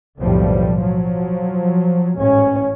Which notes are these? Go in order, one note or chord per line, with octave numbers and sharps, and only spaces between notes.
B1 F2 A2 D3 F3 G3
F3 F#3
A1 G#2 C#4